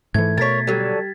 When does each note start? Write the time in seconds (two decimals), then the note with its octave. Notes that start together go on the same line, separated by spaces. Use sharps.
0.14 G#2 E3 A3 G#6
0.38 B2 A#4 C#5 A6 B6
0.67 D3 F#3 G3